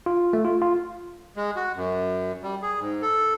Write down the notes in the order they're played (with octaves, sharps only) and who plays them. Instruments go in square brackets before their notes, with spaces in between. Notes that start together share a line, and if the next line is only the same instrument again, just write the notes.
[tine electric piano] F4
A3
F4
F4
[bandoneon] G#3
F#4
F#2
G3
G#4
G#2
A4